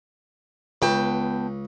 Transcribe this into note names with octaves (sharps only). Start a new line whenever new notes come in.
C#2 B3 G5 A5